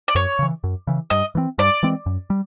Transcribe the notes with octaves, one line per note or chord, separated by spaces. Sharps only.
D5
F#2 C#5
C#3 E3
F#2
C#3 E3
G2 D#5
E3 G#3 C4
G2 D5
E3 G#3 C4
F#2
G3